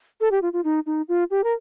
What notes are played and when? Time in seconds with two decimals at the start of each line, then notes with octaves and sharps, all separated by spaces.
0.21 A4
0.31 G4
0.42 F4
0.53 F4
0.64 D#4
0.86 D#4
1.08 F4
1.31 G4
1.44 A#4